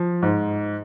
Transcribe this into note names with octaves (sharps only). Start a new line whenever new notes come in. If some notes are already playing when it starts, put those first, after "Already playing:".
Already playing: F3
G#2